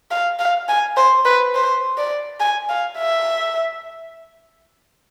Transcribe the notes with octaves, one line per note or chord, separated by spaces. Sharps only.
F5
F5
G#5
C5
B4
C5
D5
G#5
F5
E5